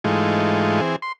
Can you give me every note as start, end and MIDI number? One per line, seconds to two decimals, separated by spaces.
0.04 0.81 44
0.04 0.81 52
0.04 0.81 56
0.04 0.81 57
0.04 0.81 63
0.04 0.81 65
0.81 0.96 52
0.81 0.96 60
0.81 0.96 68
1.02 1.12 84